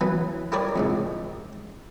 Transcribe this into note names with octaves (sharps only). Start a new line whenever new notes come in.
E3 F#3 B3
E4 G4 A#4 C#5 D5
F2 G#2 C3